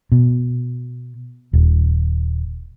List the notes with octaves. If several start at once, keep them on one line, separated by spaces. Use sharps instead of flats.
B2
D#1